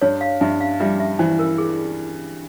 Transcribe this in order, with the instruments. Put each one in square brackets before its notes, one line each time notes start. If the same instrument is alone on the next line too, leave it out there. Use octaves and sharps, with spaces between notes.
[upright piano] G2 [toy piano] C#5
[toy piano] F5
[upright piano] G2 [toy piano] E5
[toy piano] F5
[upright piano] G3 [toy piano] E5
[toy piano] E5
[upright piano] E3 [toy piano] C5
[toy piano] A#4
G#4